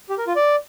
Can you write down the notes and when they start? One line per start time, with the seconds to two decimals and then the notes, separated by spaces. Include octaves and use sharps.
0.09 G4
0.18 A#4
0.27 F4
0.36 D5